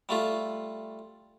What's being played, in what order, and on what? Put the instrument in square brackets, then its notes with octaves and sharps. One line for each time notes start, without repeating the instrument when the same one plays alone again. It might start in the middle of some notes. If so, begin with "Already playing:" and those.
[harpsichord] G3 A3 F4